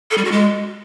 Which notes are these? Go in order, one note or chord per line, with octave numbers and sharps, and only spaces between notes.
A4
G3
F#4
G#3